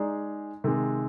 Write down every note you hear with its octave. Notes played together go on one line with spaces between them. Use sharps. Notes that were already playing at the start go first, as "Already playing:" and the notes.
Already playing: G#3 D#4 G#4 D5
C3 D#3 G#3